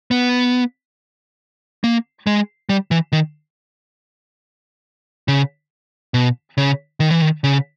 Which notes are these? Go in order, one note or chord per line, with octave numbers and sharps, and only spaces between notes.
B3
A#3
G#3
G3
E3
D#3
C#3
B2
C#3
D#3
E3
D#3
C#3